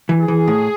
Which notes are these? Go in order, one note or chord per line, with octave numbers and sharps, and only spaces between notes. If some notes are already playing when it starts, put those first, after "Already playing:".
E3
G#4
E3
A2